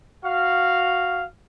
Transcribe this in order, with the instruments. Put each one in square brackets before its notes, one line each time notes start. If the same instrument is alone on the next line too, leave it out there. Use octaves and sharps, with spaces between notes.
[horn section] F#4 F5